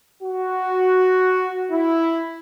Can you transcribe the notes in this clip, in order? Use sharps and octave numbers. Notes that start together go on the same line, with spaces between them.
F#4
E4